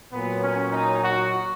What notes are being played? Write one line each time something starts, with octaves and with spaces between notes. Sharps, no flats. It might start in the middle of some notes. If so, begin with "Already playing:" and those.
A#2 F#3 B3
C#4
D#4
F#4